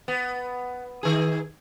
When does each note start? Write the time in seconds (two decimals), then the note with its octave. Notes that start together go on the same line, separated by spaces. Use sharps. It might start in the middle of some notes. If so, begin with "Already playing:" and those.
0.08 B3
1.03 D#3 G#4